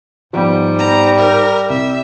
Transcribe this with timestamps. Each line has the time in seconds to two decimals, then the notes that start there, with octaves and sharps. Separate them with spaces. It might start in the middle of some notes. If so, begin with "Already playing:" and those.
0.33 G#2 F3 G3 B3
0.79 B3 A#5
1.18 A#4 E5
1.70 C2 E5